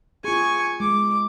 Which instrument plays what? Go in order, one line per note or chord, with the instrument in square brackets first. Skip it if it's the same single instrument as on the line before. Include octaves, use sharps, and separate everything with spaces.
[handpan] F4 G#4 [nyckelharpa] G#5 C#6
[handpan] G#3 [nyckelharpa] D6